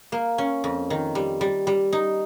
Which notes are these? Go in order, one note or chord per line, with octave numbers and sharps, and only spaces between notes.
A#3
C#4
F2
D#3
G3
G3
G3
D#4